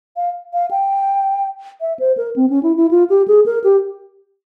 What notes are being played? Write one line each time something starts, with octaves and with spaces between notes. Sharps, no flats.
F5
F5
G5
E5
C5
A#4
C4
C#4
E4
E4
F4
G4
G#4
A#4
G4